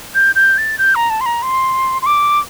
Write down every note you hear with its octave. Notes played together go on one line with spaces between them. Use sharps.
G6
G6
A6
G6
A#5
A5
C6
A#5
C6
C6
D6